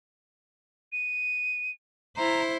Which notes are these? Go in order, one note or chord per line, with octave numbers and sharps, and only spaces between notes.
D#7
E4 C5 A#5